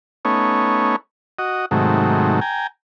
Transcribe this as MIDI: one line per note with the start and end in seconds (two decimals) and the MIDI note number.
0.25 0.96 57
0.25 0.96 59
0.25 0.96 61
0.25 0.96 63
0.25 0.96 73
1.39 1.66 66
1.39 1.66 75
1.71 2.40 44
1.71 2.40 48
1.71 2.40 51
1.71 2.40 54
1.71 2.40 57
2.41 2.67 79
2.41 2.67 80
2.41 2.67 82